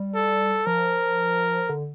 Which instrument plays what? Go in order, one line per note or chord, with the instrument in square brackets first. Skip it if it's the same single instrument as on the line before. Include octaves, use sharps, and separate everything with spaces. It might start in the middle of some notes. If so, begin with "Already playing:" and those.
Already playing: [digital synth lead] G3
[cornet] A4
[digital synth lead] F3 [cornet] A#4
[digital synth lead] D3